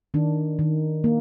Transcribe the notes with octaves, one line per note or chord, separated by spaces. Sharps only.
D#3 D4
D#3
A#3